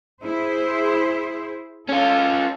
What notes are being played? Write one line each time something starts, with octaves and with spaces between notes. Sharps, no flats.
E4 G#4 C5
C#4 F4 A4